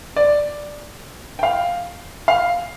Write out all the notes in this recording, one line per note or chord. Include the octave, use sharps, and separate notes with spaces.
D5
G5
F5
F5